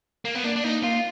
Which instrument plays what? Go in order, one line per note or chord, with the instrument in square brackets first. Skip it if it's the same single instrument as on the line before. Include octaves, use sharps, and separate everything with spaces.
[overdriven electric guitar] A#3
B3
[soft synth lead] A#3 [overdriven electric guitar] D4
[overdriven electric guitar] D4
[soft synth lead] A#3 [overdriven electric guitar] D#4
[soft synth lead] A#3 [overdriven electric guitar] F4